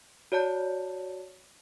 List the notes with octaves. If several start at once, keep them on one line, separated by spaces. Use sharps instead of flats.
F#4 C#5 D5 A5 G6